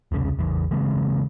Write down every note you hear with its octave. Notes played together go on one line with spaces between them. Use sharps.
E1 C2 C#3
A1 E2
C#3 E3 G#3 C4